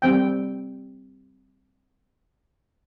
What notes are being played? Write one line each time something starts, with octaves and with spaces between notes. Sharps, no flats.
G3 C4 G5